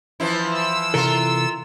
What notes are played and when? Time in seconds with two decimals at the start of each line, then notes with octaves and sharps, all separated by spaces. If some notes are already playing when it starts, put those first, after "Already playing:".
0.20 E3 F3 E4
0.51 E6
0.94 C3 E3 F4 A4 A#4